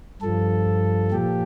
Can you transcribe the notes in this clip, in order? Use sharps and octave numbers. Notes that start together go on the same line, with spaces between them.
G2 F3 A4
A#2 F3 G4